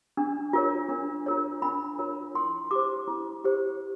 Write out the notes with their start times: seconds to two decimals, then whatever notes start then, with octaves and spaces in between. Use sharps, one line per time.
0.17 D4
0.53 F4 A#4 C#5
0.89 D4
1.26 F4 A#4 C#5
1.62 D4 B5
1.99 F4 A#4 C#5
2.35 E4 C6
2.71 G4 C5 D6
3.08 E4
3.44 G4 C5